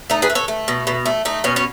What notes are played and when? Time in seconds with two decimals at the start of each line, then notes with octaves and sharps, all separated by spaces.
0.10 A3 D#4
0.22 G#4 B4
0.30 A3
0.35 A4 C#5
0.48 A3
0.68 B2
0.87 B2
1.06 A3
1.25 A3 D#4
1.44 B2 C#4
1.56 C#4